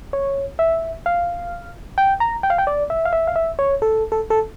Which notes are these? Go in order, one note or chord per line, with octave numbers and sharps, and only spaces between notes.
C#5
E5
F5
G5
A#5
G5
F5
G5
D5
E5
F5
E5
F5
E5
C#5
A4
A4
A4